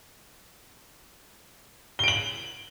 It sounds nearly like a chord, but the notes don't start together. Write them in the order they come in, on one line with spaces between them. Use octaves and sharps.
G7 D7 F#7